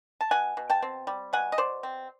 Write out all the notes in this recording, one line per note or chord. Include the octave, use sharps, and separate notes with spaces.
A5
B2 F#5 G#5
B2
G5 A5
C4
G3
B2 F#5 G#5
D#5
B2 C5 D5
C4